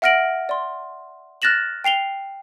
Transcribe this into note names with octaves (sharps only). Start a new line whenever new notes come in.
E5 F#5 F6 A#6 D7 F#7
D5 C6
F6 F#6 A6 A#6 E7 F#7
G5 C7 F7 G7